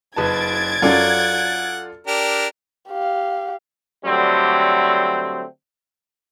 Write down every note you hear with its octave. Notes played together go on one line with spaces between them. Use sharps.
F#1 B4 A5 G#6 A6 D7
F#2 F#3 F4 A4 D5 F#5
D4 G4 A#4
G4 F5
D3 F#3 G3 A3 C4